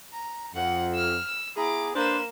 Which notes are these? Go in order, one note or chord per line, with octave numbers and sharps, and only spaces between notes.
A#5
F2 F#5
E6 F6
E6
B3 E4 G#4 A#5 D6
A#3 D4 B4 C5 E7